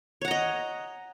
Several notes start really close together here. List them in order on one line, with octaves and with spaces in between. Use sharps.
C#5 F#5 A#5 D#5